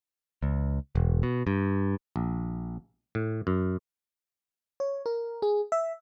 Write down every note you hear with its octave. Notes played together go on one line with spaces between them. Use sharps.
C#2
E1
B2
G2
A#1
A2
F#2
C#5
A#4
G#4
E5